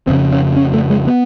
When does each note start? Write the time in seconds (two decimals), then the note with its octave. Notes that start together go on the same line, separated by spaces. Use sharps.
0.07 F2 C#3 C4
0.32 C#4
0.56 C#4
0.74 A3
0.90 G#3
1.07 B3